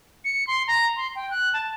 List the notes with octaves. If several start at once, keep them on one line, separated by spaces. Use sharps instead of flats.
C#7
C6
A#5
C6
G5
F#6
A5